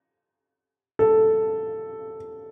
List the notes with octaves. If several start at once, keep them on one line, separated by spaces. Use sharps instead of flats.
A4